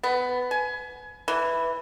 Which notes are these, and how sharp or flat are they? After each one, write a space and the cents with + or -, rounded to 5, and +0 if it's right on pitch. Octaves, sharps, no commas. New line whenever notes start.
B3 +15
G#5 +25
E3 +0